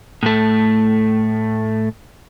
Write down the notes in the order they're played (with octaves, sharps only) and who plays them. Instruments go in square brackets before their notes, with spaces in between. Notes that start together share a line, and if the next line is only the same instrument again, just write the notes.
[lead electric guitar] A2 A3